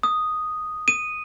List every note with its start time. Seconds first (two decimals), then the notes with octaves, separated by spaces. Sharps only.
0.03 D#6
0.88 D#7